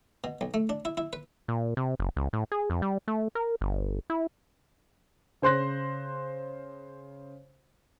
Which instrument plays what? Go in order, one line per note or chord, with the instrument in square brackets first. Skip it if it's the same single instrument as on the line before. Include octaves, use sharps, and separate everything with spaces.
[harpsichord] B2
B1
A3
D4
E4
E4
B4
[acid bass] A#2
C3
F#1
C#2
A2
G#4
F2
G3
A3
A#4
G1
E4
[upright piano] C#3 C5 C6 F#6 A#6